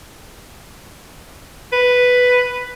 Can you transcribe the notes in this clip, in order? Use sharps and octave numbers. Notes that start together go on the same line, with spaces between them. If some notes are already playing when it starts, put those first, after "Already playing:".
B4